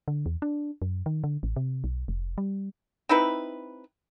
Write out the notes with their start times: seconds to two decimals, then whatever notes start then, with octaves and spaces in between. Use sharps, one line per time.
0.08 D3
0.26 E2
0.42 D4
0.82 F#2
1.06 D#3
1.24 D3
1.43 A1
1.56 C3
1.84 B1
2.08 F1
2.38 G3
3.09 C4 D#4 E4 B4